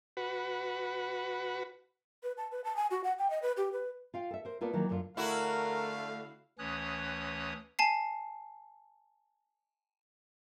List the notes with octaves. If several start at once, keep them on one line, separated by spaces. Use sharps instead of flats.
F#4 B4
B4
A5
B4
A5
G#5
F#4
F#5
G5
D#5
B4
G4
B4
F4 F5 G5
A4 E5
A#4 C5
A#3 B3 F4 A4 B4 D5
D#3 E3 F#3 A#3 F#4
F#2 D3 D4 E4 F4
D3 A3 E4 F#4 A#4 F5
D2 E3 C#4 C#5 D#6 F#6
G#5 A5 C7